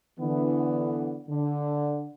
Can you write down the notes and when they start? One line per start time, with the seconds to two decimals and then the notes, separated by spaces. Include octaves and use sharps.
0.20 D3 E3 B3
1.28 D3